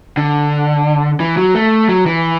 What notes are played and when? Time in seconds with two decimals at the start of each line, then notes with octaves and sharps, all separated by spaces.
0.17 D3
1.20 E3
1.37 F#3
1.55 A3
1.89 F#3
2.06 E3